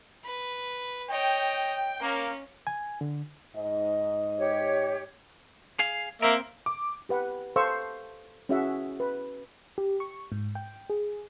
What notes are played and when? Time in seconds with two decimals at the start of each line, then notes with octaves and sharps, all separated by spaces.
0.25 B4
1.10 C#5 D#5 G5
2.01 A#3 C#4
2.67 G#5
3.01 D3
3.55 G#2 D#5
4.38 G4 C#5
5.79 G#4 F5
6.22 A#3 C4 A#4 E5
6.66 D6
7.09 G4 B4 F#5
7.56 A4 C5 F5 C#6 E6
8.49 C#4 E4 F#4 G#4 E5 F#5
9.00 B4
9.78 G4
10.00 C#6
10.32 G#2
10.55 G5
10.90 G#4